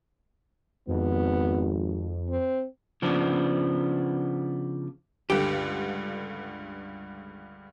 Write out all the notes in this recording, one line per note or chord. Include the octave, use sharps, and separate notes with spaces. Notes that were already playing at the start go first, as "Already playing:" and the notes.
G#1 F2 B3
C4
C#3 F3 B3 D4
C#2 G2 D3 G4